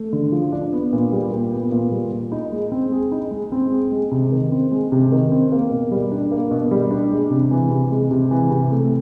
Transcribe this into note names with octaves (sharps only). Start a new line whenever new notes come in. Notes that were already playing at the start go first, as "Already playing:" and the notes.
Already playing: A3
D3
F3
D4
B3
A#2
G3
A#2
B3
A#2
G3
A#2
D#4
G#3
C4
G#4
D#4
G#3
C4
G#4
G#3
C3
D#3
C4
G#3
C3
D#3
C4
A#3
B2
G3
D4
A#3
B2
G3
D4
G#3
C3
E3
C3
G#3
C3
E3
C3
A3